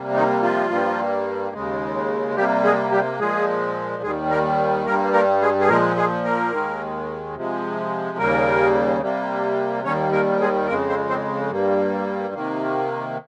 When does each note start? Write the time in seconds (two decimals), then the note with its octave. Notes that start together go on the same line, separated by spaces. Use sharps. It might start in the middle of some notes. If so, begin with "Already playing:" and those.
Already playing: C3 G3 A#3
0.15 D#3 D#4
0.42 F3 F4
0.70 G2 G3 A#3
1.53 D#2 C#3 G#3
2.36 C3 G3 A#3 G4
2.64 G#3 G#4
2.92 G3 G4
3.19 A#2 F3 G#3 G#4
4.03 D#2 D#3 G3 G#3 G#4
4.30 A#3 A#4
4.86 G2 G3 A#3 A#4
5.13 A#3 A#4
5.42 G#3 G#4
5.60 G#4
5.68 A#2 F3 G#3 A#3 A#4
5.96 G#3 G#4
6.24 A#3 A#4
6.53 D#2 D#3 G#3
7.35 C3 F3 G#3
8.18 D#2 C#3 G3 A#3 A#4
9.02 C3 G3 A#3
9.84 D#2 D#3 G3 A#3 C#4 C#5
10.12 A#3 A#4
10.41 G#3 G#4
10.67 F2 C#3 G#3 A#3 A#4
10.89 C4 C5
11.09 C4 C5
11.51 G2 G3 A#3
12.34 C3 D#3 A#3